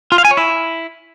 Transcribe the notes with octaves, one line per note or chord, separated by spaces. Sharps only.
F4
F5
G#5
C#5
E4